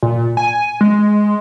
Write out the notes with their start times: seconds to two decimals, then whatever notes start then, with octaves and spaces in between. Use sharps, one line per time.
0.03 A#2
0.37 G#5
0.81 G#3